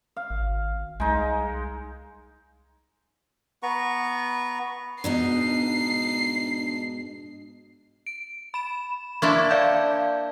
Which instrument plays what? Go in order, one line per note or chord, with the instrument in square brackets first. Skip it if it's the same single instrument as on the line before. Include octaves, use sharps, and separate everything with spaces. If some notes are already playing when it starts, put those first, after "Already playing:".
[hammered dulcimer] F5
[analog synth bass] G#1
[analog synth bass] C2 [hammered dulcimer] G#3 D#4
[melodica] B3 B4 A#5 C#6
[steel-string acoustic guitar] G#2 B2 D#4 [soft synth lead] D4 [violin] C7
[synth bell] D7
B5 E7
[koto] A#3 D4 E4 [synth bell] C6 C#6 G#6
[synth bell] D5 F5 G6